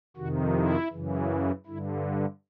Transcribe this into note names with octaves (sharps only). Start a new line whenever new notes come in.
F2 C3 D#3 F#4
E4
F#2 C#3 E3
G2 D3 E4